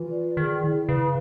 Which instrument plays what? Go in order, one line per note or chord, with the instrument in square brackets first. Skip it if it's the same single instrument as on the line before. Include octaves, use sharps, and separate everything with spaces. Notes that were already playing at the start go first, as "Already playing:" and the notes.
Already playing: [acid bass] E3 [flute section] F4
[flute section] D5
[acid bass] D#3 [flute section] G#4
[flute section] E4
[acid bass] C#3 [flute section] B4